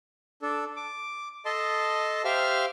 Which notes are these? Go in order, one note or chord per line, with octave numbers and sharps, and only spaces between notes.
D4 A4
D6
A4 D#5 A5 C6
G4 C5 E5 F5 F6